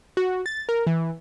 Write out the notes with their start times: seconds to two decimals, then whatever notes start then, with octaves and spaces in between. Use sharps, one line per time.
0.17 F#4
0.46 A6
0.69 A#4
0.87 E3